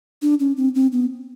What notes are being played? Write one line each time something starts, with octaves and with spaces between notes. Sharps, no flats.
D4
C#4
C4
C4
B3